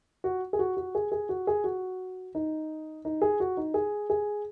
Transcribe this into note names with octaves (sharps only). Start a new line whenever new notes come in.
F#4
G#4
F#4
F#4
G#4
G#4
F#4
G#4
F#4
D#4
D#4
G#4
F#4
D#4
G#4
G#4